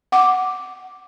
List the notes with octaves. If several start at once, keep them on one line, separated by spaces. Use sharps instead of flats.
F#5 D6